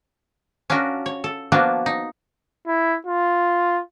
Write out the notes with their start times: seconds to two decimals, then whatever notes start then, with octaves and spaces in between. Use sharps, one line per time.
0.70 C#4 D4 F4 F#4 A#4
1.06 C#5
1.24 A4
1.52 F3 A#3 B3 D4 F4 F#4
1.86 D#4
2.67 E4
3.07 F4